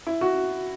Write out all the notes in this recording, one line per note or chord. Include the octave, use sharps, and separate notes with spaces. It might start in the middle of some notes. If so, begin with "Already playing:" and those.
E4
F#4